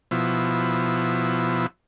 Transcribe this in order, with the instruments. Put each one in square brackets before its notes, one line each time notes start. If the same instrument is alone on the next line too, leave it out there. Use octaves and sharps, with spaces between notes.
[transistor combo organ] B2 F3 E4